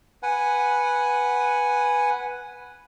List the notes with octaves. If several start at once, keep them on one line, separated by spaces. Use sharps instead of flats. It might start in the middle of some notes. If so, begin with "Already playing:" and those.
B4 F#5 G#5